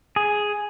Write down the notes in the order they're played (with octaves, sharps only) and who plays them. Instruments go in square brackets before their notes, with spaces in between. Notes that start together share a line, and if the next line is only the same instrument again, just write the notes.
[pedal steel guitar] G#4